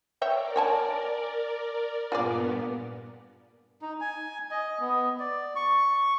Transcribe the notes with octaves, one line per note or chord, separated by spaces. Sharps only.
A#4 C#5 D5 E5 G5
C#5 G#5 A5
G2 A#2 B3 F4 G#4 D5
D#4
G#5
D#5
B3
D5
C#6